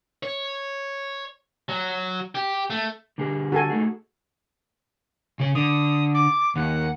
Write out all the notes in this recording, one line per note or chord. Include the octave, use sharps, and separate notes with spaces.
C#5
F#3
G4
A3
D3 G3 G#4
F#4 A4 G#5
A3 D#4 G#4
C#3 C#5
D3 D#6
D6
D#2 F#5